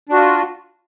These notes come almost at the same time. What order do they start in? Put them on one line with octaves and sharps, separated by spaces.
D4 F#4 F4